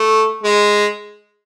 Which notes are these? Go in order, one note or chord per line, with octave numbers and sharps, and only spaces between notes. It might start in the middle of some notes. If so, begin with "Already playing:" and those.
Already playing: A3
G#3